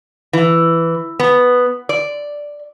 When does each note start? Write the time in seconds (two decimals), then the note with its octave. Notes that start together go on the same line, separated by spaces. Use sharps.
0.33 E3
1.20 B3
1.89 D5